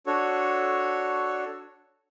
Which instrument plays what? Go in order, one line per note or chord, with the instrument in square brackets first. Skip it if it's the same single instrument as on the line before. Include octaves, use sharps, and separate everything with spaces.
[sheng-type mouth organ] D4 F#4 A4 C#5